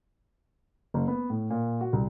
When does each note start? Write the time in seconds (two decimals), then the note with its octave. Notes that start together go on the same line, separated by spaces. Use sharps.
0.94 F#1
1.08 B3
1.30 A2
1.50 A#2
1.81 F#4
1.93 C2